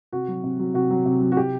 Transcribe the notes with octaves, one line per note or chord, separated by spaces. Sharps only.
C3 F#4
F#3
C3
F#3
C3 F#4
F#3
C3
F#3
F#4
C3 G4